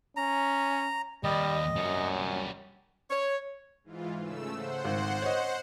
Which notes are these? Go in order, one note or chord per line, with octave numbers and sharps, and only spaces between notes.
C#4 A#5
D#2 G3 D#5
F#2 G3 C#5
C#5
G#2 E3 F4
C#3 A3 E6
C5 F#5
G#1
C#5 D#5